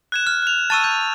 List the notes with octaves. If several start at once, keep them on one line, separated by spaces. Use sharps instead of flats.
F#6 G#6 E7
F6
F#6 F7
A5 C#6 E6 A6 D#7 E7
G6